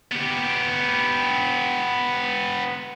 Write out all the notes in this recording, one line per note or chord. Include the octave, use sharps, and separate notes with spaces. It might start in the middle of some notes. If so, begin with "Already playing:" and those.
B3 G4